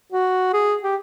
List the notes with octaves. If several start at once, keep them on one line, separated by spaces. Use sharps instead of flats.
F#4
G#4
G4